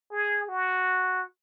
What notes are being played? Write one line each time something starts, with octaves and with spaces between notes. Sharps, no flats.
G#4
F#4